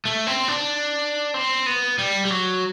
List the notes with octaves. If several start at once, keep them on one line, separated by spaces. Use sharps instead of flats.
A3
C4
D4
C4
B3
G3
G3
F#3